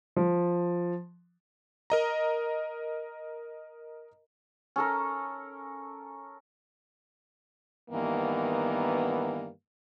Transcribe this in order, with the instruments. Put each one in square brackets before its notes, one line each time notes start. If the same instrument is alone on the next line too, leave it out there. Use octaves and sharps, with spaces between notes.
[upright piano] F3
[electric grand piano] A#4 D#5 A#5
[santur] C#4 A4 A#4
[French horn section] G2 D#3 E3 A#3 B3